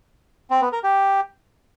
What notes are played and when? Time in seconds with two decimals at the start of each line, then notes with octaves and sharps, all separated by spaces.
0.50 C4
0.61 B3
0.72 A#4
0.83 G4